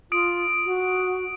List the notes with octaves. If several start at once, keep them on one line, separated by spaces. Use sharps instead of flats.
F4 D#6 D7
F#4